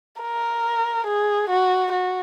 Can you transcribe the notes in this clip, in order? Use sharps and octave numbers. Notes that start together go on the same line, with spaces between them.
A#4
G#4
F#4
F#4